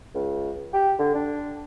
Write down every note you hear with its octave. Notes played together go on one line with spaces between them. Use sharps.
C#2
G4
D3
D4